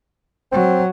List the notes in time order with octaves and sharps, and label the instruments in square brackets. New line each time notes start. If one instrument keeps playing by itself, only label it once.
[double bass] F#3 [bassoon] C4